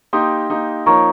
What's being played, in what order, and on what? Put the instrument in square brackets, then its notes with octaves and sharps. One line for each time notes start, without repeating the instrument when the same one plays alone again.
[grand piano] A#3 D#4 G4 [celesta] C6 D#6
[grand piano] A#3 D#4 G4
[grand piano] F3 A#3 D#4 A#4 C#5 [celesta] A#5 C#6